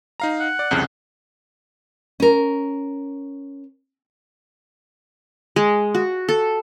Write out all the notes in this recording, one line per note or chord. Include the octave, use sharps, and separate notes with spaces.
D#4 F5 A#5
F#5
D5
C2 F2 C#3
C#4 A#4
G#3
F#4
A4